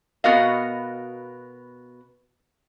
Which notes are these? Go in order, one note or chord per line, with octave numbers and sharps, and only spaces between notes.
B2 B3 F#4 A#4 D#5 F5